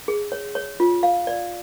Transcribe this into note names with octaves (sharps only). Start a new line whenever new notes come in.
G#4
C#5
C#5
F4
F5
D5